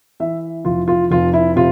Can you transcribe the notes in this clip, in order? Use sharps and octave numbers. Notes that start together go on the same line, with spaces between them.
E3 E5
F1 F4
F4
F1 F4
E4
C3 F4